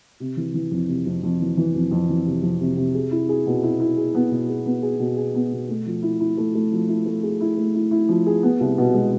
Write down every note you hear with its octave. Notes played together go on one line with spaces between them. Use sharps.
C3
E3
E3
F2
C3
F2
F2
E3
E3
F2
F2
E3
C3
F2
C3
C3
G#4
E4
G#4
B2
E4
E4
G#4
B3
B2
G#4
B3
G#4
B2
G#4
B3
B2
A3
F3
E4
E4
A3
A3
F3
E4
A3
G#4
E4
A3
E4
E4
F3
G#4
B3
C2
B2
G#3